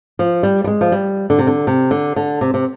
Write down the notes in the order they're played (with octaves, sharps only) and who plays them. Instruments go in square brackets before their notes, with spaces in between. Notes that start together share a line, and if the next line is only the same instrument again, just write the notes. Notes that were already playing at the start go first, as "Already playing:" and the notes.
[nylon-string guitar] F3
G3
G3
G#3
F3
G3
D3
C3
D3
C3
D3
D3
C3
C3